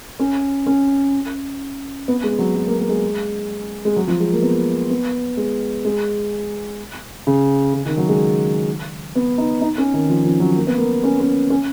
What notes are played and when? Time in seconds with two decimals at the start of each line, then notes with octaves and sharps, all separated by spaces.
0.19 C#4
0.66 C#4
2.08 B3
2.24 G#3
2.39 F#3
2.55 F#3
2.67 A#3
2.78 A#3
2.89 G#3
3.85 G#3
3.96 F#3
4.07 F3
4.20 G#3
4.32 A#3
4.43 B3
4.90 B3
5.37 G#3
5.85 G#3
7.27 C#3
7.74 C#3
7.86 D#3
7.97 F#3
8.09 G#3
9.15 B3
9.38 D#4
9.61 D#4
9.78 C#4
9.94 D#3
10.09 F3
10.25 F3
10.40 F#3
10.56 A#3
10.67 B3
10.78 A#3
11.04 C#4
11.20 C#4
11.50 C#4